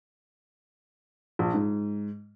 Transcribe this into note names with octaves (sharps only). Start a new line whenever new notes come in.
A#1
G#2